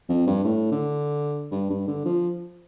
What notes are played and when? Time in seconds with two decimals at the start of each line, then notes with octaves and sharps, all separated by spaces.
0.09 F2
0.27 G2
0.44 A2
0.71 D3
1.51 G2
1.70 G2
1.88 D3
2.05 F3